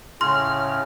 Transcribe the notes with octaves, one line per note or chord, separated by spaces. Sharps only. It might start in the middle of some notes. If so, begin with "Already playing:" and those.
A2 C#3 C#4 C6 F6